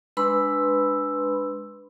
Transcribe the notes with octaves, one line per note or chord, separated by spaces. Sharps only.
G#3 D4 B4 B5 C6 E6